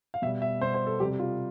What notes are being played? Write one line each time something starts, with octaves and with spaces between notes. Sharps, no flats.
F5
B2 G3 E5
E5
B2 G3 C5
C5
A4
C3 G3 G4
F4